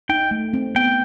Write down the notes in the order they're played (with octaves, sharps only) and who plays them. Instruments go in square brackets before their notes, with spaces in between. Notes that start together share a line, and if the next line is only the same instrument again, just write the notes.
[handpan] D#4 [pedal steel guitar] G5
[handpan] A3
C4
[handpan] B3 [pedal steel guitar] G5